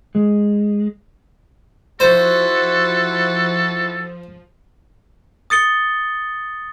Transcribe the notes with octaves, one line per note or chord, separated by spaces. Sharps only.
G#3
F3 E4 F#4 A4 C5
D#6 A6 C#7 G7